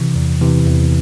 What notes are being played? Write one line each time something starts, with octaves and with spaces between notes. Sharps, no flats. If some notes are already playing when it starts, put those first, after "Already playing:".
Already playing: C3 E3
E2
C3 E3
E2